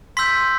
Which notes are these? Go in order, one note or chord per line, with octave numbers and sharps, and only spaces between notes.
C6 E6 G6 B6